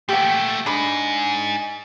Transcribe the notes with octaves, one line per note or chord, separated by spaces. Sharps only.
A#2 A3 G4 F#5
D4 D#4 G#4 B5